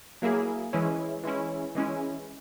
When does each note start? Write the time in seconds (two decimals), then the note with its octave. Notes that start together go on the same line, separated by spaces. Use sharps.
0.22 F#3 A#3 E4 G#4
0.73 E3 G#3 C#4 E4
1.24 E3 G#3 C#4 E4
1.75 E3 G#3 C#4 E4